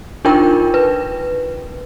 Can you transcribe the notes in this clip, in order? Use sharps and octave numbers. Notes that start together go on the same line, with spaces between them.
D4 D#4 F4 A#4 G5
B4